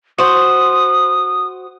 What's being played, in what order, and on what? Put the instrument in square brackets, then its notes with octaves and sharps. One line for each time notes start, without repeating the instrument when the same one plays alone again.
[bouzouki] F#4 C5 [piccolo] D#6